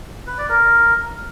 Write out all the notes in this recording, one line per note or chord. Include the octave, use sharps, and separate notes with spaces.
B4
D5
A#4